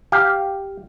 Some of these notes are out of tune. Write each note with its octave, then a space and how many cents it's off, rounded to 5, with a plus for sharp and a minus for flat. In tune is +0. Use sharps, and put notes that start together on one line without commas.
G4 +0 F5 +0